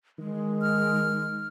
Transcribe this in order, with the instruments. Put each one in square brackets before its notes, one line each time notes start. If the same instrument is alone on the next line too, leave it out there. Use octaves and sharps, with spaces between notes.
[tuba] D#3 [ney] G#3
[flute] F6